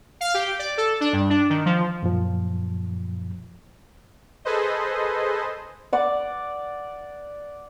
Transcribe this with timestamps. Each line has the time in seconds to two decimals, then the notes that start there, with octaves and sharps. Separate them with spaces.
0.21 F5
0.34 G4
0.59 D5
0.78 A4
1.01 D4
1.13 G2
1.30 D4
1.50 D#3
1.66 F3
2.03 F#2 A#2 F3
4.45 G#4 A4 B4 C5 D#5
5.93 D5 F#5 D6